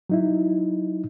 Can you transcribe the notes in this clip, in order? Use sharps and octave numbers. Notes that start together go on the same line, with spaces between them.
F#3 D#4 E4